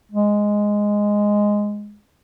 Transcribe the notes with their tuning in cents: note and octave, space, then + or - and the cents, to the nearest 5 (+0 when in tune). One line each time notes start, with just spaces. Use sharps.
G#3 -5